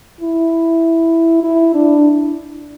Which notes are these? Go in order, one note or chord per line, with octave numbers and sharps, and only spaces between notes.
E4
E4
D4